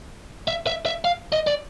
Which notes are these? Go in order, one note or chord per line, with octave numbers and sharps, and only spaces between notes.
E5
E5
E5
F5
D#5
D5